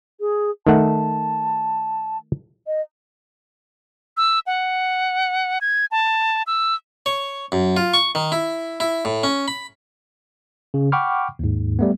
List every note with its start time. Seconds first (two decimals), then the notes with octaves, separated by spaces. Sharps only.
0.20 G#4
0.67 D#3 A3 F#5 A5
2.67 D#5
4.17 E6
4.47 F#5
5.61 G#6
5.91 A5
6.47 E6
7.06 C#5
7.52 F#2
7.77 F4
7.94 C#6
8.15 D#3
8.32 E4
8.80 E4
9.05 A2
9.23 C#4
9.48 B5
10.74 C#3
10.92 F#5 G5 B5 C#6 D6 F6
11.39 D#2 G#2
11.79 G3 A3 B3